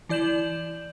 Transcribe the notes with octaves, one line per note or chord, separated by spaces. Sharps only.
E3 E4 D5 G6 E7 F#7